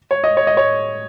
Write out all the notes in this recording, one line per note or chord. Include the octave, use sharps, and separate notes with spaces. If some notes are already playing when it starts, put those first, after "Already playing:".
C#5
D#5
C#5
D#5
C#5